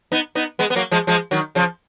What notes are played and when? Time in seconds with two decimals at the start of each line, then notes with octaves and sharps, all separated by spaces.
0.12 B3 D#4
0.35 B3 D#4
0.59 G#3 B3
0.70 B3
0.76 F#3 A#3
0.91 F3 G#3
1.07 F3 G#3
1.31 D#3 F#3
1.55 C#3 F3